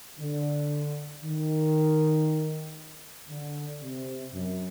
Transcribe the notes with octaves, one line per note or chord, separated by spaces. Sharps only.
D3
D#3
D3
C3
F#2